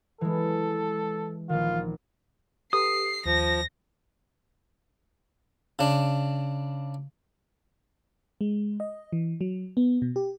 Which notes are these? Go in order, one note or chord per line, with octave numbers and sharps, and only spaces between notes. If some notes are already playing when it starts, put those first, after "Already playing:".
E3 G#3 A4
A#1 D#3 F4
G4 A4 B4 D#6 C7
D#2 F3 A#6
C#3 D4
G#3
D#5
E3
F#3
B3
B2
G4